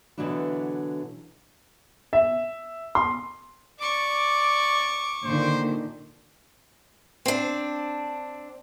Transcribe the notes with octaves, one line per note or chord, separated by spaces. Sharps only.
B2 D3 E3 F#3 D4 E4
E5
C6
D5 C#6 D6
A#2 D3 D#3 C5
C4 D4